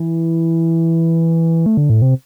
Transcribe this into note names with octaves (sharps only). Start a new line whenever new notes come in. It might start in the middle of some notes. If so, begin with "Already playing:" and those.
Already playing: E3
A3
D3
A2
C3